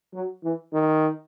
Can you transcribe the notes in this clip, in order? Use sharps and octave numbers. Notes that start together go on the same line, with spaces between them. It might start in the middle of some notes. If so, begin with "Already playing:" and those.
F#3
E3
D#3